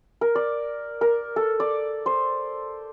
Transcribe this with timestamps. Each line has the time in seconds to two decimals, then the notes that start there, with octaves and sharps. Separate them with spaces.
0.21 A#4
0.35 D5
1.01 A#4
1.36 A4
1.60 D5
2.06 C5